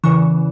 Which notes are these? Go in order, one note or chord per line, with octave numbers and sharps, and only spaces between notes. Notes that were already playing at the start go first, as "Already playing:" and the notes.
E2 C#3 E3 C#6